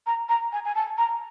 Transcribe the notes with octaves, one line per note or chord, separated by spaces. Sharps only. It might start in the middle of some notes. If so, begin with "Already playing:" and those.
A#5
A#5
G#5
G#5
A5
A#5